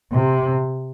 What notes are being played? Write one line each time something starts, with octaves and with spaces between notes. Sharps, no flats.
C3